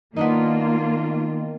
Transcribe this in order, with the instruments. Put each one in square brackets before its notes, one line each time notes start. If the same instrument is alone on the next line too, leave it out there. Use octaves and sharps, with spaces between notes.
[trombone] D#3 [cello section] A#3 F4 [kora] B3 D4 D#4